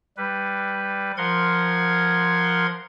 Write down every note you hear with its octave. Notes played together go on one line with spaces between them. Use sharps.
G3 B4
F3 A#4 F#5 C6 G#6